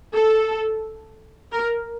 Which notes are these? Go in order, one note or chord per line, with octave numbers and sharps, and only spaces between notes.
A4
A#4